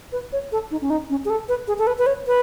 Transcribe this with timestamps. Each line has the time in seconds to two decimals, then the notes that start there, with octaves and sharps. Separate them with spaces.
0.12 B4
0.33 C#5
0.52 A4
0.71 D#4
0.82 C#4
0.90 D#4
1.10 C#4
1.25 G#4
1.30 A4
1.49 B4
1.68 G#4
1.79 A4
1.87 B4
1.98 B4
2.06 C#5
2.27 B4